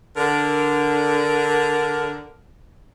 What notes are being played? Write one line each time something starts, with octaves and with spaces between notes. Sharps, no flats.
D3 A#4